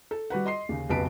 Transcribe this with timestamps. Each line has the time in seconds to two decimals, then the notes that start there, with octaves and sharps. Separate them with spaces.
0.11 A4
0.30 G3 F#4 B4 F#5
0.45 D#5 C6 C7
0.69 D#2 C#3
0.90 F1 B1 C#3 B4 A5 D7